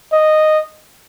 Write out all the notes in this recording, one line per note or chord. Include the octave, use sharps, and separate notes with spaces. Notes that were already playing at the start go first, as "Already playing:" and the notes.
D#5